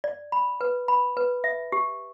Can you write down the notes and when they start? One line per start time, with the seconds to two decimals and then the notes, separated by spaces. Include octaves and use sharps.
0.04 D5
0.32 B5
0.61 B4
0.88 B5
1.17 B4
1.44 E5
1.72 G4